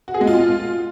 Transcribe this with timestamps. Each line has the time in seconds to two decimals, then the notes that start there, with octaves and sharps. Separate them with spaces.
0.08 F#4
0.14 G#4
0.21 G#3
0.27 F4